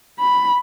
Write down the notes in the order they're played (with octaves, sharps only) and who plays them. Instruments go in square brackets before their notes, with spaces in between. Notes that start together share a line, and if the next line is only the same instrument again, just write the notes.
[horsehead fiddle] B5